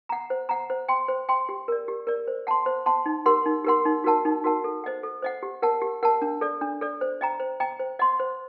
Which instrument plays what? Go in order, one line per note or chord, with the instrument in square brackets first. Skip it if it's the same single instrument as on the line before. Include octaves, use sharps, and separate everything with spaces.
[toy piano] F#5 A#5
C5
F#5 A#5
C5
G5 C6
C5
G5 C6
G4
A#4 D5
G4
A#4 D5
C5
F#5 A5 C6
C5
F#5 A5 C6
D#4
G4 A#4 F#5 C6
D#4
G4 A#4 F#5 C6
D#4
F#4 A#4 F#5 A5
D#4
F#4 A#4 F#5 A5
A4
C5 D#5 F#5
A4
C5 D#5 F#5
G4
A#4 F#5 A5
G4
A#4 F#5 A5
D4
A4 D5
D4
A4 D5
C5
D#5 G5 A#5
C5
D#5 G5 A#5
C5
D#5 F#5 C6
C5